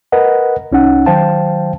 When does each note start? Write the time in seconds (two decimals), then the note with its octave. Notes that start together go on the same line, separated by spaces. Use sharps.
0.12 A#4 B4 D#5 F#5
0.72 C2 C#4 D#4 F#5
1.06 D#3 F#3 C5 F5 G5 A5